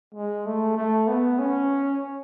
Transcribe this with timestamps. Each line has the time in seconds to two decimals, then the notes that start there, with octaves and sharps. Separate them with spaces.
0.15 G#3
0.46 A3
0.77 A3
1.08 B3
1.39 C#4